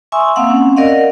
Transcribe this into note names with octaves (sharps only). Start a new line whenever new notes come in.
E5 G#5 C6 C#6 D#6 E6
A#3 C4 F5 F#5 E6
C4 C#4
A#4 D5 D#5 F5 F#5